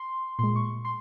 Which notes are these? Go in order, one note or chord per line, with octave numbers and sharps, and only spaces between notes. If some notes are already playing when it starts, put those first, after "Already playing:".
Already playing: C6
A#2 G#3 C6
C#6
C6